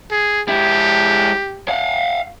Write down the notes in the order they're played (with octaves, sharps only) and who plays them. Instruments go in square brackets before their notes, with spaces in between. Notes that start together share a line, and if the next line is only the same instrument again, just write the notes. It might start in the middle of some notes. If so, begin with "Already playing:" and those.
[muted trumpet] G#4
[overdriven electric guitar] G#3 E4 [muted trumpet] G4
[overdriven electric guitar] F5 F#5